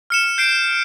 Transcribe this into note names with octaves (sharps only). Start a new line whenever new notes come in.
F6 C#7 E7
G6 C7 D7